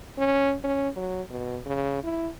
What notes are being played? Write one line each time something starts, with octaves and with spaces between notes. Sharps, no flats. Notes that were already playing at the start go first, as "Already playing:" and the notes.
C#4
C#4
F#3
B2
C#3
E4